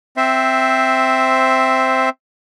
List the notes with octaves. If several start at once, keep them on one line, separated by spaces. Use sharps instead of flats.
C4 C5 E5